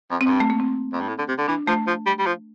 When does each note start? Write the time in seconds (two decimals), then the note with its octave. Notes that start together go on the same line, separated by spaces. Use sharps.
0.11 F2
0.21 C4
0.26 F2
0.30 G2
0.40 A3
0.50 A#3
0.60 C4
0.93 F2
1.01 G2
1.08 A2
1.19 D3
1.28 C3
1.38 D3
1.48 E3 D4
1.67 F3 A3
1.87 F3
2.06 G3
2.19 G3
2.26 F3